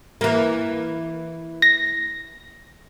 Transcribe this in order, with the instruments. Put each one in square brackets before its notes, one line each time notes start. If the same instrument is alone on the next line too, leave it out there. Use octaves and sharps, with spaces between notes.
[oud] E3 A#3
[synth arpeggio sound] A#6